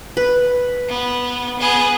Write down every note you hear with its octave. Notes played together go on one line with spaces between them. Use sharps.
B4
B3
B3 G#4